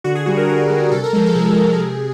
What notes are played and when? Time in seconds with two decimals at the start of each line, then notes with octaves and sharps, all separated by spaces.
0.04 D3 F#4
0.15 G#4
0.26 G3 F#4
0.37 A#4
0.49 D3 A#4
0.70 G3
0.91 C3 A4
1.04 A#4
1.13 F3 G#3 A4
1.26 A4
1.35 C3 G#4
1.57 F3 G#3
1.79 C3